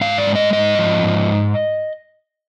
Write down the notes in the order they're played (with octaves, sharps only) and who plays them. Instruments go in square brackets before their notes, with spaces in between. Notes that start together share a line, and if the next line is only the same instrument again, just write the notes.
[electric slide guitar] G#2 F5
D5
G#3
D#5
G#2 D#5
F3
G#2